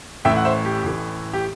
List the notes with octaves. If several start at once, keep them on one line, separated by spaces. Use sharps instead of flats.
A1 A2 E3 A3 E5 G5
F#5
C5 E5
G4
A1 A2 E3 A3
G4